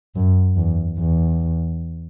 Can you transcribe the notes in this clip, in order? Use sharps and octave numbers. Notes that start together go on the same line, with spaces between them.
F#2
E2
E2